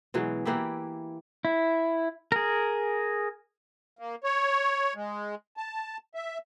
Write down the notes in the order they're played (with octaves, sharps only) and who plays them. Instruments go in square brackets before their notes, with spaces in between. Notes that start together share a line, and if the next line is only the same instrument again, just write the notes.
[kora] B2 E3 F#3 G#3
E3 A#3 E4 G4
[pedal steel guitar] E4
G#4 A#4
[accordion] A#3
C#5
G#3
A5
E5